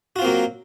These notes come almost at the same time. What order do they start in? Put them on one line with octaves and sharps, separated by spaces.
F#4 F4 C4 A#3 F#3